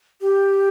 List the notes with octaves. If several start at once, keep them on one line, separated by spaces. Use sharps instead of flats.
G4